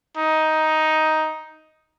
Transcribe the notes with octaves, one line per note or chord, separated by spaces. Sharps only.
D#4